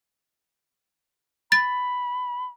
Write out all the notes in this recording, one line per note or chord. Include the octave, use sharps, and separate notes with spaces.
B5 A6